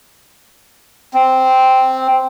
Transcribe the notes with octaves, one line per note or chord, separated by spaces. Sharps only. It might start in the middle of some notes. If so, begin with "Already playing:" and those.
C4